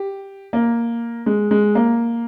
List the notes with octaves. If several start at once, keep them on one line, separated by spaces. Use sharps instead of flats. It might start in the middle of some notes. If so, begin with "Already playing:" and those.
Already playing: G4
A#3
G#3
G#3
A#3